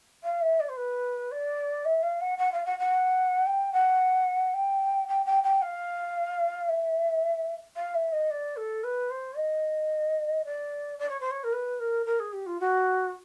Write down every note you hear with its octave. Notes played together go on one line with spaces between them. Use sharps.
F5
E5
D5
C5
B4
D5
E5
F5
F#5
F#5
F5
F#5
F#5
G5
F#5
G5
G5
G5
G5
F5
E5
F5
E5
D#5
D5
A4
B4
C5
D#5
D5
D5
C#5
C5
C#5
A#4
B4
A#4
A#4
G#4
G4
F4
F#4